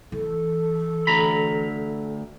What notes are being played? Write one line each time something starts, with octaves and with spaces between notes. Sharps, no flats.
E3 A4
D2 A#5 B5